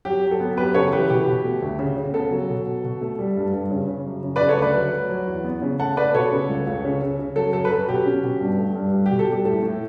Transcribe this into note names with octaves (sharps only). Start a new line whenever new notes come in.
F#3 G4
F#3
A4
B3
F#2 G4 B4
C#3 A4 C#5
E3 G4 B4
B2 G4
B2
A3
D2
C#3
C#3
B3 A4
F#3
B2
B2
B2
A3
G3
G2
G2
C#3
C#3
F#2
C#3
C#3 B4 D5
A4 C#5
D2 B4 D5
F#3
F#3
F#3
E2
B3
C#3
A3 F#5 A5
A3 B4 D5
B2 A4 C#5
C#3
C#2
C#2
C#3
C#3
C#3
F#3 A4
F#2 A4
B4
F#3 A4
B2 G4
C#4
B2
G2
A3
G2
G3
G4
B2
A4
G3 G4
A2 A4
A2